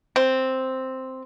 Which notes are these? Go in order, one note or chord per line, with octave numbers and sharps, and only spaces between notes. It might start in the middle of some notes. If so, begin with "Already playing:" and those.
C4